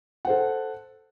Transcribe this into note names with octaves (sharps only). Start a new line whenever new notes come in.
A4 C5 F#5